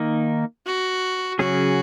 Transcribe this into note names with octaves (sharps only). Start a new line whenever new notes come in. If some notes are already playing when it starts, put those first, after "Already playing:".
Already playing: D#3 A#3 D#4
F#4
C#3 F#3 C#4 F#4 G#4